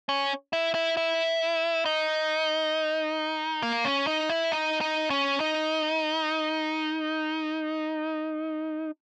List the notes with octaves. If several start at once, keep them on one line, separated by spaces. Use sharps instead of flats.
C#4
E4
E4
E4
D#4
A#3
C#4
D#4
E4
D#4
D#4
C#4
D#4